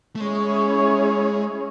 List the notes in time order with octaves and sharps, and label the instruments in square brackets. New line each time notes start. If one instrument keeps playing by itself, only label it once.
[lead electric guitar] A3
[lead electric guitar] G#3 [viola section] C#4 E4 G#4 C#5